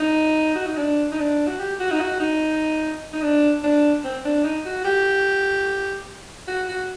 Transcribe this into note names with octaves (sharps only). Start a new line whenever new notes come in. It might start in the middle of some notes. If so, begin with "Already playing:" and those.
Already playing: D#4
F#4
D#4
D4
D#4
D4
F#4
G4
F#4
D#4
F#4
D#4
D#4
D4
D4
C4
D4
D#4
F#4
G4
F#4
F#4